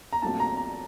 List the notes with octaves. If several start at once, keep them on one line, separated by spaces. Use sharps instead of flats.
A#5
A#1 A#2 F#3 A3 C4 A5
A#5
A#5